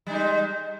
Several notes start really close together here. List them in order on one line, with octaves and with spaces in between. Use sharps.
G3 D#4 G#3